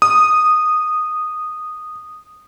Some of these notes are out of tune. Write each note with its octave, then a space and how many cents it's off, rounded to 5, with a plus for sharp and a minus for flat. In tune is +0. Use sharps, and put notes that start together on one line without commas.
D#6 -10